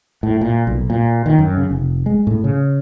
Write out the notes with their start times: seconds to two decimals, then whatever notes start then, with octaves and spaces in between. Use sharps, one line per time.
0.23 A2
0.41 A#2
0.67 B1
0.90 A#2
1.26 D#3
1.38 F#2
1.57 C#3
1.71 F1
2.06 G#3
2.27 A2
2.44 C#3